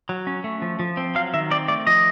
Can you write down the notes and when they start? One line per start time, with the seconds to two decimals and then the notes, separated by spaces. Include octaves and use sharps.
0.09 F#3
0.27 C#4
0.44 A3
0.62 F3
0.79 F3
0.97 C4
1.15 F#3 F5
1.34 D#3 E5
1.51 C4 D5
1.68 A3 D5
1.87 F3 D#5